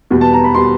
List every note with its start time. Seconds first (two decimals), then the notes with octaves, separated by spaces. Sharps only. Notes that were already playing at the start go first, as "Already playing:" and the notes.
0.10 E2 B2 G3
0.21 A5
0.33 A#5
0.44 B5
0.54 B2 G3 C6